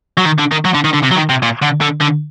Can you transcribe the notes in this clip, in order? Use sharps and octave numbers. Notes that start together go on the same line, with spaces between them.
F#3
D#3
D3
D#3
F#3
D3
D#3
D3
C3
F#3
D#3
C3
A#2
D3
D3
D3